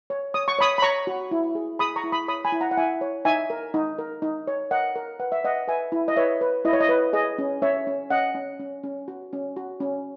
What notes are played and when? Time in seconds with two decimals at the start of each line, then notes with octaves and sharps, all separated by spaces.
0.10 C#5
0.34 C#5 D#6
0.48 C#6
0.59 C#5 B5 D#6
0.78 B5
0.82 C#5 A#5 C#6
1.07 F#4
1.31 E4
1.55 G#4
1.79 G#4 B5 D#6
1.96 A#5 C#6
2.04 E4
2.12 B5 D#6
2.28 C#5 B5 D#6
2.45 G#5 B5
2.52 E4
2.61 F#5 A#5
2.71 F#5
2.77 E4 E5 G#5
3.01 C#5
3.25 D#4 E5 G#5
3.50 A#4
3.74 D#4
3.98 A#4
4.22 D#4
4.47 C#5
4.71 A#4 D#5 F#5
4.96 A#4
5.20 B4 F#5
5.32 E5
5.44 B4 D#5 F#5
5.68 B4 E5 G#5
5.92 E4
6.08 D#5
6.16 B4 C#5 E5
6.41 B4
6.65 E4 D#5
6.73 C#5
6.80 D#5
6.89 B4
7.13 G#4 D#5
7.38 C#4
7.62 C#4 C#5 E5
7.87 C#4
8.10 C#4 D#5 F#5
8.35 C#4
8.60 C#4
8.83 C#4
9.08 F#4
9.33 C#4
9.57 F#4
9.80 C#4